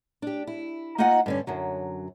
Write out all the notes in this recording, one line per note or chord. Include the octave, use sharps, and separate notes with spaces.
D4 G4
E4
A#3 D#4 F4 D#5 F#5 G#5
G2 D3 C#4
F#2 D3 F#3